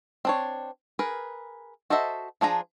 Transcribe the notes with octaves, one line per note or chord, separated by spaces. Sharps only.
C4 D4 C#5
G#4 A#4 B4
F#4 A4 C5 D#5 E5
F3 D4 G#4 A#5